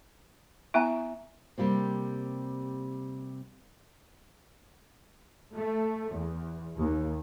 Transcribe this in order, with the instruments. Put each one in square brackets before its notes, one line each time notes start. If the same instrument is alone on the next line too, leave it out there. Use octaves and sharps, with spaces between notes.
[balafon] B3 E4 [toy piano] E5 G#5 A#5
[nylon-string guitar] C3 G3 A#3 C4
[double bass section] A3
E2
D#2